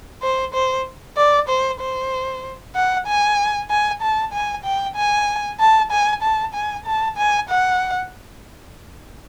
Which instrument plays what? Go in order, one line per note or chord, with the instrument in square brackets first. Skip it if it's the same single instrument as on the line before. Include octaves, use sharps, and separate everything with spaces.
[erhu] C5
C5
D5
C5
C5
F#5
G#5
G#5
A5
G#5
G5
G#5
A5
G#5
A5
G#5
A5
G#5
F#5